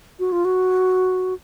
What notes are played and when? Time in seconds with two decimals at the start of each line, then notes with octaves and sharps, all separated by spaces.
0.20 F#4
0.32 F4
0.45 F#4